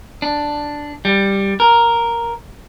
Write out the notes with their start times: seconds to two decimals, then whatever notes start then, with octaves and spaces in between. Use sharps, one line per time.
0.22 D4
1.05 G3
1.60 A#4